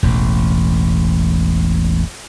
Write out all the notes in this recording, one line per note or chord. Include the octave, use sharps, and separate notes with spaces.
E1 A1